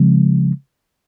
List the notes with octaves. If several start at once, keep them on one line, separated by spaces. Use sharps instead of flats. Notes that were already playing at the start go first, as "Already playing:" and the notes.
Already playing: C#3 F3 G#3 C4